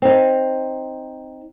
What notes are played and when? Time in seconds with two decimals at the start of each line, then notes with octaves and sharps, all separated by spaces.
0.02 C4 D#4